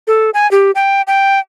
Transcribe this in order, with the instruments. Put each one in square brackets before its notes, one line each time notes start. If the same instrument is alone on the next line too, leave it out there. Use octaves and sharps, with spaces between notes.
[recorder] A4
G#5
G4
G5
G5